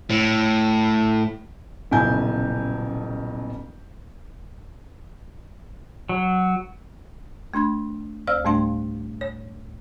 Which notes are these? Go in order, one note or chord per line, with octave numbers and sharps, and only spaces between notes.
A2
D#1 B1 C#3 E4 G#5 G6
F#3
A3 D4 B5 G#6
D2 C5 F5 E6 F6
A2 G3 A3 D4 F5 C6
C#5